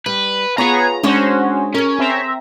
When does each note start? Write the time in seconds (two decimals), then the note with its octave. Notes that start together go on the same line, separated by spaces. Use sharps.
0.06 G3 B4
0.58 B3 F4 G#4 B4 C#5 A#5
1.03 G#3 C#4 D4 F#4 C5 C#5
1.75 C#4 G#4 A#4
1.99 C4 E5 A#5